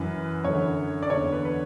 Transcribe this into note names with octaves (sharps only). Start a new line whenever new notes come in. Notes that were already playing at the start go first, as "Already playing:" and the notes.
Already playing: F#2 E3 B4
F#2 D3 C#5
D5
E2 D3 C#5
B4
B4